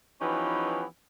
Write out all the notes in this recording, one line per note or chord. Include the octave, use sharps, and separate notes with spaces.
E3 F3 B3 C#4 D#4 G4